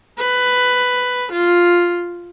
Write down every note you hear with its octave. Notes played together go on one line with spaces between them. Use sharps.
B4
F4